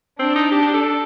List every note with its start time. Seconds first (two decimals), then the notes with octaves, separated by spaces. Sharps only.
0.19 C4 D4
0.35 D#4
0.51 D4 G4
0.62 G4
0.74 A4